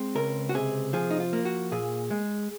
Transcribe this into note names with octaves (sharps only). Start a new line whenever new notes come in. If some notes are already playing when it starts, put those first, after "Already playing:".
Already playing: G#3 C4
C#2 A#4
F#4
C3 G#4
F3 G#4
D#4
F4
A#3
F#4
A#2 G#4
G#3